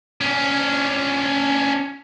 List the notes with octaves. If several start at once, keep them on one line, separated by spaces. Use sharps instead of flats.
C#4 D4